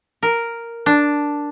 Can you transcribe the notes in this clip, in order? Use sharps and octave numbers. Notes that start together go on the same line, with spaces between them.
A#4
D4